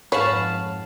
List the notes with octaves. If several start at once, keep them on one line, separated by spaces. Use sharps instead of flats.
F2 G#2 C#4 B4 C#5 F5 F#5 A5